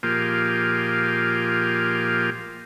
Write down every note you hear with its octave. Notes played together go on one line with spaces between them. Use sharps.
A#2 F3 A#3 F4 G4 G#4